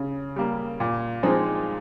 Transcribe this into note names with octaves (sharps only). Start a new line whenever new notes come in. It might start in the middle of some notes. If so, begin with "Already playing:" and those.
Already playing: C#3
G3 A#3
A#2
F3 G#3 C4 D#4